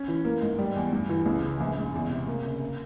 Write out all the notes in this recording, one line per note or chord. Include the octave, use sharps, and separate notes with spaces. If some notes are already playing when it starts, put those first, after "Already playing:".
Already playing: C#4
E3
A#3
G#2
G3
E2
G2
E3
C#2
C#3
A#1
G#2
E2
C3
A#3
C#3
A#3